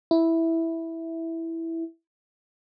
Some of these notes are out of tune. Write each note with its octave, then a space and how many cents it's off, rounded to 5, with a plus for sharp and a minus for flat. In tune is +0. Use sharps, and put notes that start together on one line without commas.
E4 -5